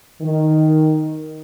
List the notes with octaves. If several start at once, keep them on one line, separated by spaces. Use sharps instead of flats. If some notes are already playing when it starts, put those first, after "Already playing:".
D#3